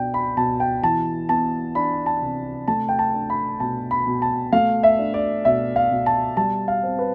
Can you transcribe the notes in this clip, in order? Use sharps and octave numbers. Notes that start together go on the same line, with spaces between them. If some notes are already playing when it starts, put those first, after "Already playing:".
Already playing: B2 D4 G5
B5
B2 A5
G5
E3 A5
B3 A5
D4 B5
A5
C3
A3 A5
G5
A5
D4
B5
B2 A5
B5
B2
A5
A3 F5
E5
D4
D5
B2 E5
F5
B2
A5
G3 A5
F5
C4
B4